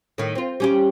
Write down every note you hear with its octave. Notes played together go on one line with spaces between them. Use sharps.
A2 D#3
C4 F4
G3 C#4 G4